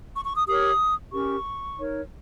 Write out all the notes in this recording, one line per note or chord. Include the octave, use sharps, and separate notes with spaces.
C#6
C#6
D#6
G4 A#4 C#5 D#6
C#4 G4 A#4 C#6
D#4 A#4 C#5